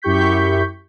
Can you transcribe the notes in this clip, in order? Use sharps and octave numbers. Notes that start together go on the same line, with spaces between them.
F#2 E4 G4 C#6 G6 B6